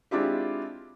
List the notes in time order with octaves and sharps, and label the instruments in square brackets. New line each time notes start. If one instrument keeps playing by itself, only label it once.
[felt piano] G#3 C4 D4 E4 F4 G4